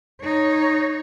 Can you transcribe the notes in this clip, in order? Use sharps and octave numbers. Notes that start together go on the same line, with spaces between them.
D#4 C#5